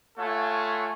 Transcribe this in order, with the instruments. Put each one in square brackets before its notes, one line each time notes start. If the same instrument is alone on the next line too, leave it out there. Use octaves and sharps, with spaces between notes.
[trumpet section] A3 F4 A4 C#5 F#5 G#5